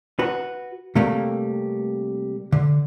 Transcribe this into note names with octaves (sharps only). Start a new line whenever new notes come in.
F#4 B4
C3 G3 A3 A#3
D3